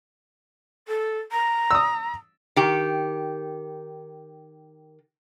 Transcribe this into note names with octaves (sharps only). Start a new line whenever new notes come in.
A4
A#5
D#6 E6
D#3 G4